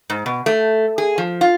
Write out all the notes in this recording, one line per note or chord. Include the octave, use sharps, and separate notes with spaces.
G#2
B2
A3
G#4
F3
F4